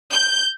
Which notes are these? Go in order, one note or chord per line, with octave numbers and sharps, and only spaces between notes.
G6